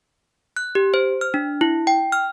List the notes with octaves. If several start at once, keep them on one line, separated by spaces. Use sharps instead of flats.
F#6
G4
C5
F6
D4
E4
G5
F6